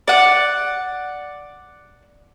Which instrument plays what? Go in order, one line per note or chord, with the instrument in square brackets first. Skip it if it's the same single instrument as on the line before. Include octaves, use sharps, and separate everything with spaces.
[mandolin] D5 F#5